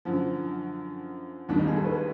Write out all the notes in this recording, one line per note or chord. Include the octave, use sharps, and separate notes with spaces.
F#2 D3 F3
D#2 D#3 G3 D4
D#4
G#4
A4
B4